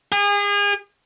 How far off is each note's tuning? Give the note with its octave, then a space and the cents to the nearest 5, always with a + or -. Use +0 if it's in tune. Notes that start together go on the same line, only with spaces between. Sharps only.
G#4 -35